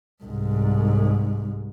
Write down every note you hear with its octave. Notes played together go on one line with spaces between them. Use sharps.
C2 G#2